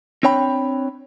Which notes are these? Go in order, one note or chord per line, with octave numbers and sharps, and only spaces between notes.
C4 D4 C#5 G5 B5